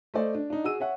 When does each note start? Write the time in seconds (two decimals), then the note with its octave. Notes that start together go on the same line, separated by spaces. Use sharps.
0.14 A3 A4 C5 D5 D#5
0.35 D4
0.50 D4 D#4
0.64 F#4 G#4 E6 D#7
0.80 C#5 E5 F#5